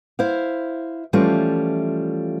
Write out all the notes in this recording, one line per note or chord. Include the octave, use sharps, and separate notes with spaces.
E4 C5 F5
E3 F3 G3 A3 C#4 F4